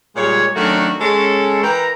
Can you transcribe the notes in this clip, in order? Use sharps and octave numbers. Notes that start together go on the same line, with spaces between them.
A#2 G3 G#3 C#5
D#3 F#3 A3 C#4 D4 F#4
G#3 C#4 A4
E3 A#4 G5 A#5